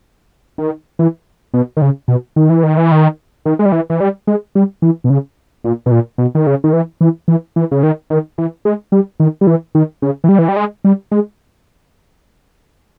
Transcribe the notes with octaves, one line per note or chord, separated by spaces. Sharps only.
D#3
E3
B2
D#3
C#3
B2
D#3
E3
D#3
E3
D#3
D#3
G#3
G3
E3
E3
G3
G#3
G3
E3
B2
C#3
A#2
B2
A#2
B2
D#3
C#3
D#3
E3
E3
E3
E3
C#3
D#3
D#3
E3
G#3
G3
D#3
G3
E3
D#3
C#3
E3
G3
E3
G3
G#3
G3
G#3